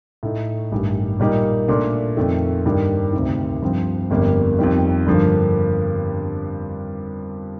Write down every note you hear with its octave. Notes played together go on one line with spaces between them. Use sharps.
A2 A3 D#4
A1 G2 D#3
A#2 G3 A#3 D#4
A#2 A3 D4 F4
F2 D#3 A3
G2 D#3 A#3 D4
D2 C3 D#3
G2 F3 C4
G1 F2 D3 G3 A#3
F2 D#3 G3
G2 D3 F3 A#3